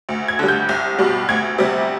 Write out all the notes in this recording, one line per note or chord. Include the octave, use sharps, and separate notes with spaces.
D2
G#6
D3 G3
G6
C2
B2 G3
D2 G#6
C3 G3